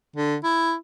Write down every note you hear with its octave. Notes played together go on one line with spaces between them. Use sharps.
D3
E4